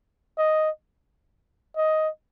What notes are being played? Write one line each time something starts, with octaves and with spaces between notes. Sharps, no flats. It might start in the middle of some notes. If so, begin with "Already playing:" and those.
D#5
D#5